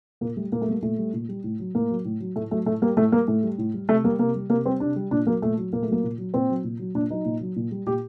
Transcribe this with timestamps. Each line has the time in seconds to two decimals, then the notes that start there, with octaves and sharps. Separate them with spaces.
0.21 A#2 A#3
0.37 G3 A3
0.52 A#2 A#3
0.61 A3
0.67 G3 A#3
0.82 A#2 A3
0.98 G3
1.13 A#2
1.29 G3
1.44 A2
1.60 F#3
1.75 A2 A#3
1.90 F#3
2.05 A2
2.20 F#3
2.36 A2 A3
2.51 F#3 A3
2.66 A2 A3
2.82 G3 A#3
2.97 A2 A3
3.12 G3 A#3
3.28 A2 A3
3.43 G3
3.58 A2
3.74 G3
3.89 C3 A3
4.04 G3 A#3
4.19 C3 A#3
4.35 G3
4.50 C3 A#3
4.66 G3 C4
4.80 C3 D4
4.96 G3
5.11 A#2 D4
5.26 F#3 A#3
5.42 A#2 A3
5.57 F#3
5.73 A#2 A#3
5.82 A3
5.88 F#3 A#3
6.04 A#2
6.18 F#3
6.34 A#2 C4
6.49 F#3
6.64 A#2
6.79 F#3
6.95 A#2 D4
7.10 F#3 D#4
7.25 A#2
7.41 F#3
7.56 A#2
7.71 G3
7.86 A#2 G4